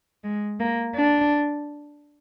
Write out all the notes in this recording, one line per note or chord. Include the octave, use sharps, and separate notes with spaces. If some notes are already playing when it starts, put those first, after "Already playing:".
G#3
A#3
D4